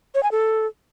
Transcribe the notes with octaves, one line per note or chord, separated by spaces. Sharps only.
C#5
G#5
A4